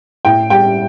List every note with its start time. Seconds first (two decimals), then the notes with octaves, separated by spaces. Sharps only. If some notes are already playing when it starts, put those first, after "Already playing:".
0.25 A2 G5
0.50 G3 G5